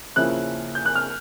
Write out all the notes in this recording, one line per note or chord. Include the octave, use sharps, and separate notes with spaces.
C#3 F3 A#3 C#4 E4 F#6
G6
F#6
F6